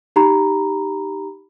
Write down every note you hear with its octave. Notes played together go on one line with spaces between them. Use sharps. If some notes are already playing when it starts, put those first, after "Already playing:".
D#4 G4 A#5 B5